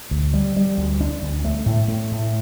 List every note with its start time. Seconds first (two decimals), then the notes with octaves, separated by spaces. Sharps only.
0.11 D2
0.34 G3
0.56 G3
0.77 D2
1.01 D4
1.22 D2
1.45 A3
1.66 A2
1.88 A3
2.11 A2